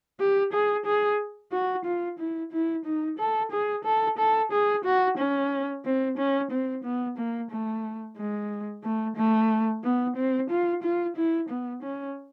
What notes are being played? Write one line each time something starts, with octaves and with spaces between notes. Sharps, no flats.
G4
G#4
G#4
F#4
F4
E4
E4
D#4
A4
G#4
A4
A4
G#4
F#4
C#4
C4
C#4
C4
B3
A#3
A3
G#3
A3
A3
B3
C4
F4
F4
E4
B3
C#4